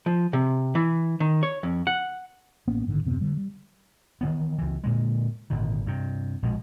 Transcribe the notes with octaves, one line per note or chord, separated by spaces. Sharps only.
F3
C3
E3
D#3
C#5
F2
F#5
A1 A#3 B3 C#4
A1 G#2 D3 D#3
D#1 F#2 C3 B3
D3 G3
G3
D#3 E3 B3
C#2 E3
A#2 D3 G#3
G#1 A#2 D3 D#3
G2 C3
A#1 B2 G#3